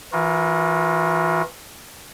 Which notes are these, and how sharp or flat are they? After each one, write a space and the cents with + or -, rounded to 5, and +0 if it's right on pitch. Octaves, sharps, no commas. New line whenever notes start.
E3 +0 F4 +45 A#4 +15